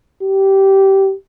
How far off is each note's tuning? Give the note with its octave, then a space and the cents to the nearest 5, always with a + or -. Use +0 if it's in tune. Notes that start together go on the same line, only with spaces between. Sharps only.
G4 -15